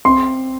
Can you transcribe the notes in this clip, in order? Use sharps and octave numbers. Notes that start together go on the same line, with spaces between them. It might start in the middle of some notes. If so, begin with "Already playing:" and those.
C4 C6